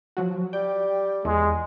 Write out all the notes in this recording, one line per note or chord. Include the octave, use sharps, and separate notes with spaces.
F3 F#3 F#4
G3 G5
E2 G#3